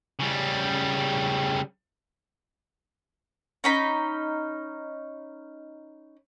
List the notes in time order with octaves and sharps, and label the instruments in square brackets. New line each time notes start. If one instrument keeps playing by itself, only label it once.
[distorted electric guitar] C#3 G3
[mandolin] C#4 D#4 B5